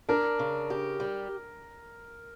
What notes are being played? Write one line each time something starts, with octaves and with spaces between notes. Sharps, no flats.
D4 A#4
C#3
G4
G3